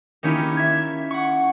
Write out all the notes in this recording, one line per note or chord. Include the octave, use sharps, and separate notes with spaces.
D#3 A#3 C#4 D#4 E4 G4
E5 G#6
F#5 C#6